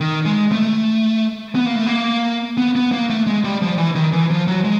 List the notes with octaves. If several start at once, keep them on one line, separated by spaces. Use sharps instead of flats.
D#3
G#3
A3
B3
A#3
A3
A#3
B3
B3
A#3
A3
G#3
G3
F3
E3
D#3
E3
F3
F#3
G#3